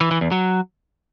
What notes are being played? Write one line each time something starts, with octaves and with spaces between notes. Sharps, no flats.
E3
E3
E2
F#3